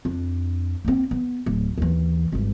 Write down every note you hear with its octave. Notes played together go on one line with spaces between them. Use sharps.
F2 D4
A#3 C4
B3
D1
D#2 E3
G#1 G2